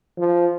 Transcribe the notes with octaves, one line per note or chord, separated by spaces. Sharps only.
F3